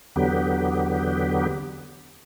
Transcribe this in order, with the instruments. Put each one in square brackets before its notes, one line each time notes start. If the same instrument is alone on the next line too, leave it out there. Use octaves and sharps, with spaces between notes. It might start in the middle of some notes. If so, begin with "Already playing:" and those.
[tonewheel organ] E2 D3 F#3 B3 G4